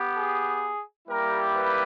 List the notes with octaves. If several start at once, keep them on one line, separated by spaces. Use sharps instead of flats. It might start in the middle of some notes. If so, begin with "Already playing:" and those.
Already playing: B3 G4
G#4
G3 A#3 E4 G4 A#4
B4